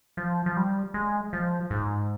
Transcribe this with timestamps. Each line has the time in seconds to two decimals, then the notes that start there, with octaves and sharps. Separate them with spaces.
0.17 F3
0.46 F3
0.57 G3
0.94 G#3
1.33 F3
1.70 G#2